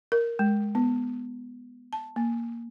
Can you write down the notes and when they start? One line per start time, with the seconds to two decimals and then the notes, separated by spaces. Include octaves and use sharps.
0.12 A#4
0.39 G#3
0.75 B3
1.93 A5
2.16 A#3